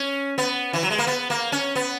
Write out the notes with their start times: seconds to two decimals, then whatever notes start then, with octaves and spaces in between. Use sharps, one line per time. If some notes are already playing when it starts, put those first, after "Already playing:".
Already playing: C#4
0.38 B3
0.73 E3
0.83 F#3
0.90 G#3
0.98 A#3
1.07 B3
1.30 A#3
1.52 C#4
1.75 B3